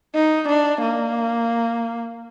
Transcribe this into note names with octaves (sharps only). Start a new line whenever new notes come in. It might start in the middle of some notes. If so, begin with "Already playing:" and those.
D#4
D4
A#3